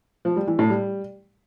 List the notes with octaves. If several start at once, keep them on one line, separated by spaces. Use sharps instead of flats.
F3
G3
E3
A2
G3